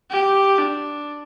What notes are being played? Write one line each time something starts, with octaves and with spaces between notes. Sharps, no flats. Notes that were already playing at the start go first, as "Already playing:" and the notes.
G4
D4